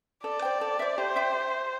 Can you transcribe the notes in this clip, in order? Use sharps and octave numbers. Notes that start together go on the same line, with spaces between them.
A4 D5
C5 G5
A4
C5 E5
G4 C5
E5 G5